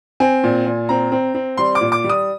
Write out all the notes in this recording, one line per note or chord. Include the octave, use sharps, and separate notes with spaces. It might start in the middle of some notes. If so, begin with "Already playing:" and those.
C4 G#5
A#2
A#2
C4 A#5
C4
C4
G3 C6
D6
A#2
D6
G3
D#6